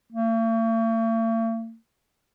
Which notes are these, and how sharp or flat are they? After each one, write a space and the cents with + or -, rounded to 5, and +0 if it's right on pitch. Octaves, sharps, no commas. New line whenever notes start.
A3 +45